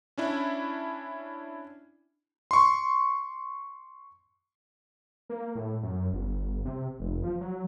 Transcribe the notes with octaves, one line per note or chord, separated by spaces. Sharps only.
C#4 D4 E4
C6 C#6
A#3
A2
F#2
G1
C3
F1
F3
F#3